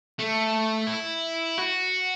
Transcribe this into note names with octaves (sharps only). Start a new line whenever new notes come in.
A3
E4
F#4